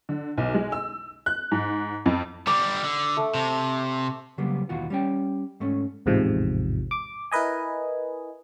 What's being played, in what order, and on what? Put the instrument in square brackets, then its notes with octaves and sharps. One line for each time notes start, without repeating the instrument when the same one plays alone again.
[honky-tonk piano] D3
B1
G#3
E6
F#6
G#2
F2
[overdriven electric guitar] D3 G3 [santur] D6
[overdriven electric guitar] D3
[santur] A3
[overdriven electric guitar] C3
[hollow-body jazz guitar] C#3 F#3 G3 A#3 B3
D#2 B2 E3 F4 F#4
G3 C#4 G5
G#2 A3 C#4
[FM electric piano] A1 E2 G#2 C3 F3
D6
E4 A#4 B4 D#5 G#5